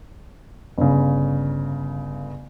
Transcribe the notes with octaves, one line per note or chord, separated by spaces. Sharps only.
G1 C#3